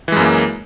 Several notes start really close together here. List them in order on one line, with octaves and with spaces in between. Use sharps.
E3 G#3 F#2 A#3